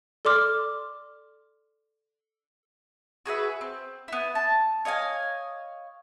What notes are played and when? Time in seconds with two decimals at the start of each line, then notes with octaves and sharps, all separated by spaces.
0.25 A4 D5 C6 D6 F6
3.26 F#4 G#4 B4 E5
3.61 C4
4.08 B3 E4
4.35 A5
4.85 C#5 D#5 F5 G#5